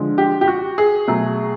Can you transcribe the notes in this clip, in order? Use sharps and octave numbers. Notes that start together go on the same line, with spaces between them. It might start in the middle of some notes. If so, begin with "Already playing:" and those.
Already playing: D3 F3 G#3
G4
G4
F#4
G#4
B2 F#3 A3